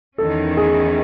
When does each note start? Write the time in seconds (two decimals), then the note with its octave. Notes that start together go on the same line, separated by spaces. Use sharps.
0.18 E2 D#3 A3 C#4 A4
0.57 G#4